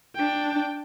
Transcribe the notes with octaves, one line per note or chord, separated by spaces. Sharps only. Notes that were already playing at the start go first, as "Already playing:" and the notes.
D4 G5